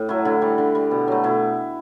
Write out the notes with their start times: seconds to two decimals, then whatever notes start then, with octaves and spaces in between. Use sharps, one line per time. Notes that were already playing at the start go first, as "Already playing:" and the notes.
Already playing: A2
0.09 F#3 A3 E4
0.25 D3 E4
0.42 G3
0.58 D3
0.75 G3
0.91 B2
1.08 F#3 A3
1.23 B2 E4